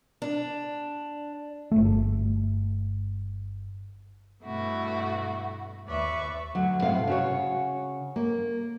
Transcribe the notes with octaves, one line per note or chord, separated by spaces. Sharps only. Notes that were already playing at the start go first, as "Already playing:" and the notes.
D4
G1 A3
G2 B2 A3 E4 F#4
D#2 B4 D5 E5 C#6
D2 F#3
A2 C3 F5
C#3 F#4 C#5
A#3